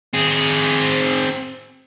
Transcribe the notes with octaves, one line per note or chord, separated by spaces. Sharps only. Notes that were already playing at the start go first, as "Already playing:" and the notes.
C4 G#4